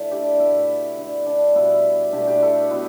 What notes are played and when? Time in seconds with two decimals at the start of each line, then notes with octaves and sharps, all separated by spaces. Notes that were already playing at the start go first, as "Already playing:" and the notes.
Already playing: D3 A3 E4 A4
0.11 D4 G4
0.39 B2 A3 B3 E4
0.98 D3 A3
1.26 D4
1.55 B2 G3 B3 E4
2.12 B2 A3 D4 G4
2.27 D4 G4
2.42 E4 A4
2.70 B2 G3 B3 E4